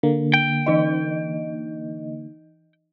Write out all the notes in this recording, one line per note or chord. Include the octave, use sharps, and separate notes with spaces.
D3 A#3
G5
E3 D#4 D#5